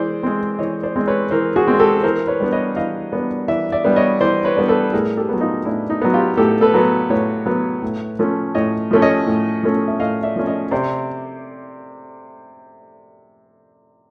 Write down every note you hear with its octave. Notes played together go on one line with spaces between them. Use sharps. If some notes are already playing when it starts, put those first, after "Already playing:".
Already playing: E3 G#3 C5 D5
G#3 C4
E3 C#5 D#5
C5 D5
G#3 C4
B4 C#5
E3 A#4 C5
F#4 G#4
G#3 C4
G4 A4
E3 A#4 C5
B4 C#5
G3 B3 D4
C#5 D#5
E3 D#5 F5
G3 B3 D4
E3 D5 E5
D5 E5
G3 B3 D4
C#5 D#5
E3 C5 D5
B4 C#5
G3 B3 D4
A4 B4
A2 G#4 A#4
G4 A4
F#3 B3
D#4 F4
A2 D4 E4
D#4
F#3 B3
F4 G4
A2 G4 A4
A4 B4
F#3 B3
A2 B4 C#5
F#3 B3
A2
F3 A3 C#4
A2 C#5 D#5
F3 A3 C#4
C#5 D#5
A2
F3 A3 C#4
E5
A2 D#5 F5
D5 E5
F3 A3 C#4
C#5 D#5
C3 C5 D5